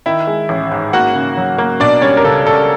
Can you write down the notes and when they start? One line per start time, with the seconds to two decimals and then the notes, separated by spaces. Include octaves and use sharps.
0.06 D#3 E4 E5
0.27 G#3
0.49 A1
0.71 G#2
0.93 A#3 F#4 F#5
1.15 C#3
1.37 F#3
1.58 A#3
1.80 B2 D4 D5
2.02 G3 C#4 C#5
2.17 A#4
2.24 C#2 A4
2.46 C#2 A4